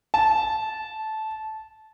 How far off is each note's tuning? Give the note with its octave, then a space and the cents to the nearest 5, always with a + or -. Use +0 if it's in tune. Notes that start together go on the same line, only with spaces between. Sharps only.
A5 -15